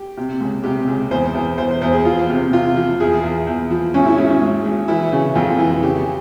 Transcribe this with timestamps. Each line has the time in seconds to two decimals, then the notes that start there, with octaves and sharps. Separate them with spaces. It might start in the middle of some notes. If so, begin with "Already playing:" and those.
Already playing: G4
0.17 C3
0.41 C#2
0.64 C3 G4
0.88 C#2
1.11 E2 C5
1.34 E2
1.58 E2 C5
1.71 C5
1.81 E2 C5
1.93 G#4
2.05 F3 F4
2.30 C3
2.53 C3 F4
2.76 F3
3.00 E2 G#4
3.24 E2
3.47 E2
3.70 F3
3.94 G#1 C#4
4.06 E4
4.17 G#1 C#4
4.30 C#4
4.41 G#2
4.65 G#1
4.88 E3 E4
5.12 C#3
5.35 F2 F4
5.59 E3
5.82 C#3 G4